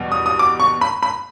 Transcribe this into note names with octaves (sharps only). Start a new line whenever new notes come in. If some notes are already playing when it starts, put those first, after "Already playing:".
Already playing: E2 B2 G3
D#6
D#6
D6
C#6
B5
B5